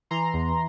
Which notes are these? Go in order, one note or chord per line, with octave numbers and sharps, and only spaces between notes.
E3 A#5 C6
E2